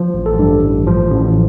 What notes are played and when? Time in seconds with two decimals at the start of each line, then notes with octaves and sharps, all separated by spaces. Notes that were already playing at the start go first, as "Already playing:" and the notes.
Already playing: F3
0.14 A1
0.26 A4
0.39 G2
0.62 A1
0.87 F3
1.11 A1